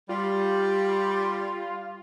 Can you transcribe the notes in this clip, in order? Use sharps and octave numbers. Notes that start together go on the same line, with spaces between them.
G3 F4